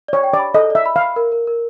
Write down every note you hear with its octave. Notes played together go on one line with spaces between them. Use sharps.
C#5 D5
G5
D5
B5
A4 D#5
D5 E5
B5
F5
B5
A#4
A#4
A#4